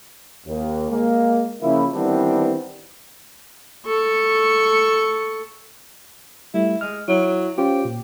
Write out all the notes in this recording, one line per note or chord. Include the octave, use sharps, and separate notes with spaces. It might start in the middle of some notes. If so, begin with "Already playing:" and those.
D#2
G#3 A#3
C#3 F3 A#3 E4
D#3 E3 G3 B3 C4 D4
A4 C#6
G3 A3 E4
G#3 F6
F#3 E4
C#4 F4 G4 C5
A#2